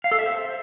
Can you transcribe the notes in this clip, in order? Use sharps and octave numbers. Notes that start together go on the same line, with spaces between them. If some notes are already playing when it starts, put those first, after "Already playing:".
F5
A4
E5
C5